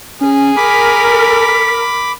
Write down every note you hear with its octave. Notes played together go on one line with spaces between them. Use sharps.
C#4 G#4
A#4 B5 D6 B6